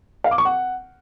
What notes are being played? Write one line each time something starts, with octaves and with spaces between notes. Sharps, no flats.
F5
D6
C#6
F#5